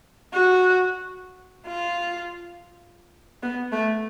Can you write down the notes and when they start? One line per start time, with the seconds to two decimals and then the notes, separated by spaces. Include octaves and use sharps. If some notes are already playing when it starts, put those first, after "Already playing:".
0.34 F#4
1.66 F4
3.43 B3
3.72 A3